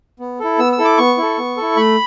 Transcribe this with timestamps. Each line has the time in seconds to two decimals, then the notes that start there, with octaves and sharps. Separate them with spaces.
0.19 B3
0.40 E4 A4
0.59 B3 E6
0.72 E6
0.78 E4 A4
0.85 D6
0.98 B3 C#6
1.18 E4 A4
1.38 B3
1.57 E4 A4
1.77 A3 B5